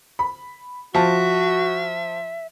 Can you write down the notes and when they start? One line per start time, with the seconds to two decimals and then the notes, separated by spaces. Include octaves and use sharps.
0.19 B5
0.95 F3 F#4 E5 A5